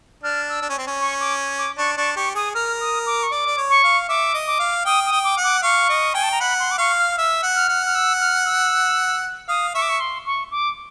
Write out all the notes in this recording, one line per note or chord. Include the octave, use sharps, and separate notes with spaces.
D4 F6
E6
D4
C#4
C4
C#4
C#6
D6
D6
D4 C#6
D4 C#6
G4 C#6
G#4 D#6
A#4 F6
D#6
D6
C#6
D5 D6
D5
C#5
C#6
F5
E5 D6
D#5
D6
F5
G5 D#6
D#6
G5
D6
F#5
D6
F5 C#6
D#5
G5 G#5
A5
A#5
F#5 B5
C6
D6
F5 C#6
F6
E5 E6
F#5
F6
F#5
F6
E6
F6
E6
F5 D#6
E5 C#6
D6
C#6
C6
C#6
D6